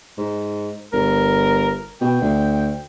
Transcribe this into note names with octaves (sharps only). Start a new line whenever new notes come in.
G#2
G1 A#4
B2 G5
D2